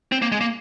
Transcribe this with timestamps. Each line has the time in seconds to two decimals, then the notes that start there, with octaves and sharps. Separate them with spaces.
0.12 C4
0.22 A#3
0.32 G#3
0.41 A#3